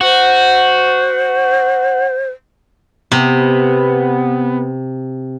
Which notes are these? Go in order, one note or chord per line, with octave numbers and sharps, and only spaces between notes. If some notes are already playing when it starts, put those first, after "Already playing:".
F#4 C5
C3 B3